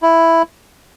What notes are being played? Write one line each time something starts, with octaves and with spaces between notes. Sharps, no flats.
E4